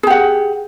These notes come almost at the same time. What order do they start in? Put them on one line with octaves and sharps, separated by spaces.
G#4 G4 F#5